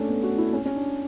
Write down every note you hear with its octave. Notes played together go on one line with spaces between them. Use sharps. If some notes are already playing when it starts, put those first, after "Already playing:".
Already playing: A3 C#4 D4
B3
F#4
E4
C#4
C#4
D4